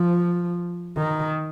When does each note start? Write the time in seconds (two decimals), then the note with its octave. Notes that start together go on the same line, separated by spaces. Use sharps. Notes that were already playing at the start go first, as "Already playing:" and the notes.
Already playing: F3
0.98 D#3